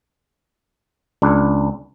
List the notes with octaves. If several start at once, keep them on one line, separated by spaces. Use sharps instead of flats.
C#2 D4